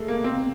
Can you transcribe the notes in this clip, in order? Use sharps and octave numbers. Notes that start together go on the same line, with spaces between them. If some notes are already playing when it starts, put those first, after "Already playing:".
Already playing: G#3 A3
A#3
C4